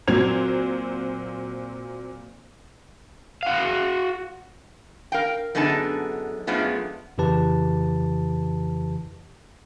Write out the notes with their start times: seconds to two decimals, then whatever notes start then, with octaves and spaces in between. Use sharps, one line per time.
0.07 A#2 F#3 C4 G#6 F7
3.43 F#4 F5
5.12 A#4 F5 G5
5.55 F#2 D3 B3 D#4 G#4 A5
6.47 F#2 F3 G#3 A3 B3 D4
7.18 F2 C#3 E3 G4 B4 A5